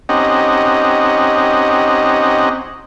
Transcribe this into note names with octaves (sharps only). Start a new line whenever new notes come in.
C4 C#4 D#4 G4 D#5 F#5